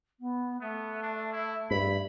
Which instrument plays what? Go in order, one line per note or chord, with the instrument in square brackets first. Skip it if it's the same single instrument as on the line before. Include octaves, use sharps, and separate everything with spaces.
[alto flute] B3
[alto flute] A3 [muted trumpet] B3
[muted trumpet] D4
E4
[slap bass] G2 [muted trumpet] B5